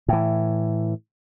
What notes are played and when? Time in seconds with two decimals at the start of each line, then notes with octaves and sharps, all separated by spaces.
0.08 A2 E3